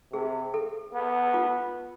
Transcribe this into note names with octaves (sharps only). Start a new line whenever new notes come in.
C3 G#4
A4
B3
F4